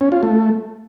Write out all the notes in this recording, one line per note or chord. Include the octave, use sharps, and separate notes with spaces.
C#4
F4
A3